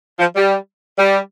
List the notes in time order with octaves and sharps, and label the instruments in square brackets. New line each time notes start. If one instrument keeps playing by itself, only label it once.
[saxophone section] F3
G3
G3